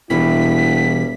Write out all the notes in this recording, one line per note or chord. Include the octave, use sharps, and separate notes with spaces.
E1 B2 E3 G3 E4 B6